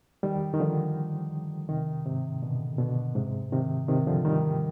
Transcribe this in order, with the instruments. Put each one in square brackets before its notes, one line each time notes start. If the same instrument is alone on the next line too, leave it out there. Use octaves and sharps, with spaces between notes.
[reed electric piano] D#3 G3
D#3
D3 F3
C3 D#3
G#2 C3
B2 D3
B2 D3
G#2 C3
C3 D#3
C3 D#3
D3 F3
D#3 G3